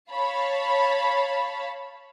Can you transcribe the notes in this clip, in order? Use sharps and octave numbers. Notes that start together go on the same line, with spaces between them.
C#5 F5 A5 B5